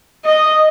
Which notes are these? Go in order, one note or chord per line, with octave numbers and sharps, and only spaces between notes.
D#5